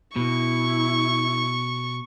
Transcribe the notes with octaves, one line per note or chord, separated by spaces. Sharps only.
B2 E4 C#6